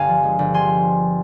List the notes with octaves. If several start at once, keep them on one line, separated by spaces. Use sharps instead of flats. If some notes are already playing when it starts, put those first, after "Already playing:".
Already playing: G1 F5 G#5 A#5
F3
G#3
G1
F3 G#5 C6